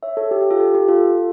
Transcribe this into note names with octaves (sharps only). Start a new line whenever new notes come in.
C#5 E5
A4 C#5
G4
G4
F4 A4
G4
G4
F4 A4